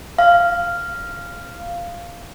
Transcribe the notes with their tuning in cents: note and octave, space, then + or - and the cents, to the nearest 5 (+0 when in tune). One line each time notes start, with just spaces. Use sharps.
F5 -5